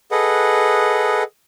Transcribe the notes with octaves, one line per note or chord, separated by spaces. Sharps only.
G#4 A4 B4 D#5 F#5